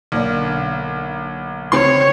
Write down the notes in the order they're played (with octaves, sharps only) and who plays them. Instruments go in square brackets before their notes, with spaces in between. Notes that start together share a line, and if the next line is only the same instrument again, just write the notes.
[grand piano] B1 [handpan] D3 A#3 D5
[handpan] C#3 A3 C4 [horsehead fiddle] C#5 [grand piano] C6